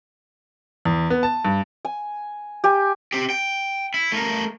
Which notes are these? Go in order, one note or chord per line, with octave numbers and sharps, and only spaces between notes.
E2
B3
A5
G2
G#5
G4 G#5
C4 G4
G5
E4
A3 A#4